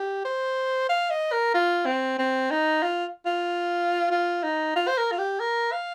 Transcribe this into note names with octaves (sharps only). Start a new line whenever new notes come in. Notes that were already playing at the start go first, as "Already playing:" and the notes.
Already playing: G4
C5
F5
D#5
A#4
F4
C4
C4
D#4
F4
F4
F4
D#4
F4
C5
A#4
F4
G4
A#4
F5